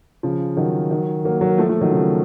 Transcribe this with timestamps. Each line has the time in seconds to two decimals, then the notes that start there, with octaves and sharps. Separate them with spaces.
0.23 C#3 F3
0.57 D#3 F#3
0.91 D#3 F#3
1.25 F#3 A#3
1.41 F#3 A#3
1.58 F3 A3
1.69 F3 A3
1.81 D#3 F#3
1.92 C#3 F3